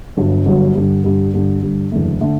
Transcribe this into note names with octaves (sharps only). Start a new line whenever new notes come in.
G1 G2 D3 F#3
G1 G2 D3 F#3
G2 D3 G3
G2 D3 G3
G2 D3 G3
G2 D3 G3
F#1 E2 D3 A3
D3 A3